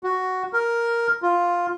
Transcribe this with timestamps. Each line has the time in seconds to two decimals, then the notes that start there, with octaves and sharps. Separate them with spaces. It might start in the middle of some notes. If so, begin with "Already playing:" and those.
0.04 F#4
0.53 A#4
1.22 F4